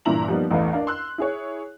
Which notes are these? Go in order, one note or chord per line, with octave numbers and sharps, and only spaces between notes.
G2 A#2 E3 E4 A#5 F#7
F3 G3 A#3 B3 D#4
A1 E2 A3 B4 F5
D4 A#4 F5
C6 E6 F#6
E4 G#4 C#5